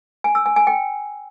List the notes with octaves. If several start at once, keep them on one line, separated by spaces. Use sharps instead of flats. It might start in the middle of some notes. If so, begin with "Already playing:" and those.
G#5
E6
G#5
G#5
G5